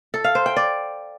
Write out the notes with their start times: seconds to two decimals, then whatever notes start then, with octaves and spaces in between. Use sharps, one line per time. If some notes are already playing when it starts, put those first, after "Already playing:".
0.14 A4
0.24 F5
0.35 C5
0.46 G5
0.56 D5